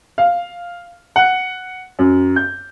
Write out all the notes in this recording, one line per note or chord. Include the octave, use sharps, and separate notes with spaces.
F5
F#5
F#2
G6